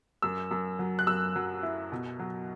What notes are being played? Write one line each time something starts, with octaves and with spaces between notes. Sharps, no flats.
F#2 E6
F#2
F#3
F#6
F#2 E6
F#3
E4
B2
F#3